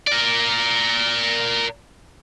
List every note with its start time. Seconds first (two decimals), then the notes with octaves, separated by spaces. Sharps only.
0.07 A#4 D5